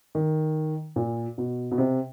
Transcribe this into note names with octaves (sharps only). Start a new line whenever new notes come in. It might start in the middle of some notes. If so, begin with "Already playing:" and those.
D#3
A#2
B2
B2
C3